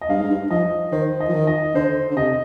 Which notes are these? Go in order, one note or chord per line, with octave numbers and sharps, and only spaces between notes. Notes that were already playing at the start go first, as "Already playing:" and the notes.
D#5
G2 F5
G#2
G2
F3 D#5
D#3 C5
D#5
F3
D#3
D#5
D3 C5
D3
C3 D#5